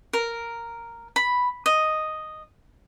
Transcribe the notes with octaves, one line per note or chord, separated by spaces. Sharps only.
A#4
B5
D#5